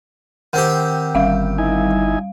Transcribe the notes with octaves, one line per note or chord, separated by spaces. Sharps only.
D#3 C4 G4 F#5
G1 G3 F5
D#4 E4 G#5